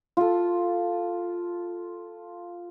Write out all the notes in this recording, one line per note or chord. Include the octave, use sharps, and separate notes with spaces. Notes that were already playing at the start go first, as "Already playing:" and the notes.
F4 A4